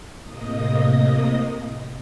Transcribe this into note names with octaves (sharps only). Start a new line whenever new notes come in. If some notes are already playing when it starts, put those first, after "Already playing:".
A2 C3 A#3 D#5 D#6